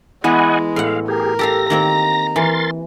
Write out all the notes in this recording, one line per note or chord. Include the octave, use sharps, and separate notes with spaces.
E3 G#3 B3 D#5 F#5 G#5
A2 F5 F#5
G4 G#4 A#4
G4 A4 F5 A#6
D#3 A#3 C4 A#5
E3 A#4 C6 A6